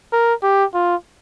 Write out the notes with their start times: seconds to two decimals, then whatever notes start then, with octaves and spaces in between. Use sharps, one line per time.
0.12 A#4
0.43 G4
0.74 F4